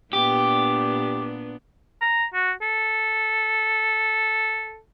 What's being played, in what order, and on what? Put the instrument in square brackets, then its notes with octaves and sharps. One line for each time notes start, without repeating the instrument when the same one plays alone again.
[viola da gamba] A#2 B3 D4 [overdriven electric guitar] G4
[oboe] A#5
F#4
A4